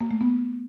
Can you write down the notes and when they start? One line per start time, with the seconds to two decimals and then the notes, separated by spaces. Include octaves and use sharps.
0.01 A#3
0.11 A3
0.21 B3